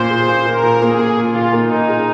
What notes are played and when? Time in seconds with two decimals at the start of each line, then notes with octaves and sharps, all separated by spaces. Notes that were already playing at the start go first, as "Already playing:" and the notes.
Already playing: A#2 A#3 C5
0.10 G#4
0.28 A#2
0.46 A#2 A#4
0.63 A#2
0.82 A#3 G#4
0.99 A#3
1.17 A#3 F4
1.35 A#2
1.53 A#3 D#4
1.71 A#2
1.89 G#4